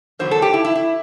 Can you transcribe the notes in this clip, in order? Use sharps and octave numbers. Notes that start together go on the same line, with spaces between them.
E2 D3 F#3 B3 C5
A4
G4
E4
E4
E4